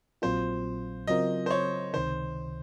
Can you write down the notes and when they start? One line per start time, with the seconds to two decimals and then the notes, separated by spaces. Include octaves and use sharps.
0.22 A#1 A#2 F#3 C4 F4 C5
1.07 C#3 F#3 C4 F4 A#4 D#5
1.46 C5
1.51 C#5
1.94 C#2 C3 D#3 C5